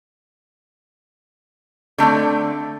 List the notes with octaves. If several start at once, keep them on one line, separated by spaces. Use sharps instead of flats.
D3 A3 C4 D5